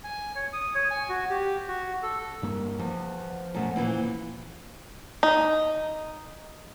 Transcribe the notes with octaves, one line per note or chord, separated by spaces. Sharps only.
G#5
C#5
D#6
C#5
G#5
F#4
G4
F#4
A4
G1 G2 A#3
E2 F3
F#2 B2 A3
A#2 E3 C4
D#4